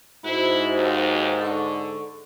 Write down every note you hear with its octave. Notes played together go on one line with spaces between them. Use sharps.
G#2 E4 F#4 C5
D#2
D3 A4 C#6